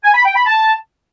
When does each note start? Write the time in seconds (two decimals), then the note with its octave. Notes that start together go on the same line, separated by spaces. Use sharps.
0.04 G#5
0.14 B5
0.25 G5
0.36 B5
0.46 A5